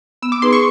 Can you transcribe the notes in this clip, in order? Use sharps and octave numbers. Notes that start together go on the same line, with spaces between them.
B3 E6
D6
D#4 G#4 B4 C6
C#6